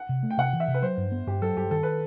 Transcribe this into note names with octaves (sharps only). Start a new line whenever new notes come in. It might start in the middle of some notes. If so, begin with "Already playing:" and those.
Already playing: F#5
C3
A3
G5
C3 F#5
E3
E5
C3
B4
F#3 C5
G2
B3
G2 G4
F#3 A4
G2 G4
D#3 A4
B4